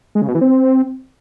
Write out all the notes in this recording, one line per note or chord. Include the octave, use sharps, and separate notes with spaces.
G#3
C#3
B2
E3
C4